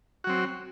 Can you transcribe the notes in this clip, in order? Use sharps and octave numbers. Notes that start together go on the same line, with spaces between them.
F#3 C4 F#4